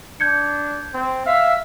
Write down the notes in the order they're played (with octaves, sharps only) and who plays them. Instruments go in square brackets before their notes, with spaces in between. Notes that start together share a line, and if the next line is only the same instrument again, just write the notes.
[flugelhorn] D4 [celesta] G6 G#6 C#7
[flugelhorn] C4
[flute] E5 [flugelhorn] F5